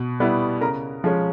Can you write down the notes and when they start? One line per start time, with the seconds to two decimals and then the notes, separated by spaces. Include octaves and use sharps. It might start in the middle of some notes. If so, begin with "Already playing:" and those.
Already playing: B2
0.20 G3 B3 E4
0.61 C#3 A#4 A#5
1.04 F3 G#3 C#4